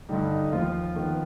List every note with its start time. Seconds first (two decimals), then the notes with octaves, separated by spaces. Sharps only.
0.09 G2 D3 G3 D#4
0.31 D#4
0.52 D#2 F3 F4
0.96 D#3 B3